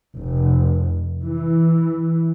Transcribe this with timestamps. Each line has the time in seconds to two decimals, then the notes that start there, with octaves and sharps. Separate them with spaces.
0.17 F1
1.22 E3